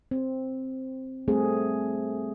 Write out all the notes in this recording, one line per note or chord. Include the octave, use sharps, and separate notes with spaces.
C4
G3 A3 C4 G#4